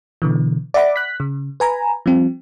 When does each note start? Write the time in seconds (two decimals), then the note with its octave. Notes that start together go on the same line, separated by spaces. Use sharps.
0.22 B2 D3 E3
0.74 D5 E5 F#5 B5 D6
0.96 F#6 B6
1.20 C#3
1.60 B4 G#5 A#5 B5
2.06 F3 G3 C4